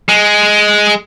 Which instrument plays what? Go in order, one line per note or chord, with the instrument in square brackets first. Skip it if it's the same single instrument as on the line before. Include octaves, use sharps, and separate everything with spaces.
[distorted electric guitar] G#3